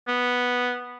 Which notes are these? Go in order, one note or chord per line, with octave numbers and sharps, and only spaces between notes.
B3